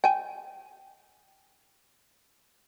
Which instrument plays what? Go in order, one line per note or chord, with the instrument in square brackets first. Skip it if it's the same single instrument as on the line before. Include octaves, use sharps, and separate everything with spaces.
[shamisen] G5 G#5